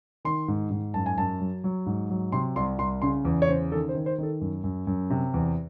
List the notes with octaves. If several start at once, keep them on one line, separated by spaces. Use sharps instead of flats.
D#3 C6
G#2
G#2
F#2 A5
G#5
F#2 A5
F#3
F#3
G#2
F#3
C3 C6
C2 C6
C2 C6
C#3 C6
E2
C#5
C#3 C5
D#3 A4
C5
D#3
C5
D#3 A4
F#2
F#2
F#2
C3
E2